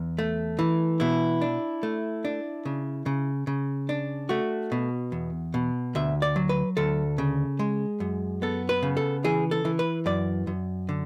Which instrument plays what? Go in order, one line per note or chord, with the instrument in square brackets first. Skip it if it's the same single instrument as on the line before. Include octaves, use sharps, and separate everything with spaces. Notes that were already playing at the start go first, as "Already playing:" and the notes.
Already playing: [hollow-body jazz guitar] E2
A3
E3
B2 E4
D4
A3
D4
C#3
C#3
C#3
D4
A3 F#4
B2
E2
B2
D2 E5
D5
F#3
B4
D2 A4
C#3
G#3
F#2
B3 A4
B4
C#3
A4
E3 G#4
A4
E3
B4
F#2 D5
F#2
D3